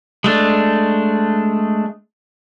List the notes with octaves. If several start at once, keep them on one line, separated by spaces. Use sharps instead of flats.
G#3 A3 D4